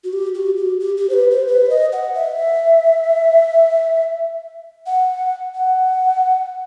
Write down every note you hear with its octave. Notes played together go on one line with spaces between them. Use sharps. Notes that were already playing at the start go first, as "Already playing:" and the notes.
F#4
G4
F#4
G4
G4
G4
C5
B4
C5
B4
C5
D#5
F#5
E5
F#5
F#5